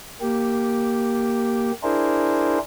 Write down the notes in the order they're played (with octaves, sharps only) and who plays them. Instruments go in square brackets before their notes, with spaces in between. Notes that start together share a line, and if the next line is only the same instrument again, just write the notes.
[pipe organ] A#3 G4
D4 E4 G#4 A#4 C5